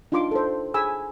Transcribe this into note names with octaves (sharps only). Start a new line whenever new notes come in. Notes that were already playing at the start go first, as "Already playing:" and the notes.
D4 D#4 F4 C6 D6
A4 C5
G#4 G#5 B5 E6